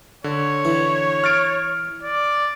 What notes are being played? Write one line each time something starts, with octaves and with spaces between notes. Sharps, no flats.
D3 C#5
E3
F6 A6 D7
D5